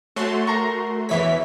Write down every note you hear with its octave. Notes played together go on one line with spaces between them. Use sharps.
A3 F#4 C#5 A5 C6
A#4 A#5 C#6
E2 E3 C#5 E5 B6